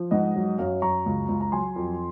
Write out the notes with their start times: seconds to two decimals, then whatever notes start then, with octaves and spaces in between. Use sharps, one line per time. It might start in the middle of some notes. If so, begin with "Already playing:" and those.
Already playing: F3
0.11 G#2 D#5 F#5
0.36 F#3
0.58 F#2 C#5 F5
0.82 F#2 A#5 C#6
1.06 C#2
1.29 C#2
1.41 A#5
1.52 F#3 G#5 C6
1.76 F2